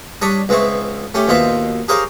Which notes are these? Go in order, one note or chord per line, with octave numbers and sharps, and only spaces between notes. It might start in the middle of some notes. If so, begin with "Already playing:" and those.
G3 D4 C#5 B5 C#6 D#6
C#2 B3 C4 E4 C#6
A3 C#4 G4
D#2 B2 F4 C5 E5
G4 G#4 A#4 C5 C#5 F5